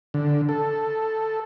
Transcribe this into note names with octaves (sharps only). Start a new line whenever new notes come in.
D3
A4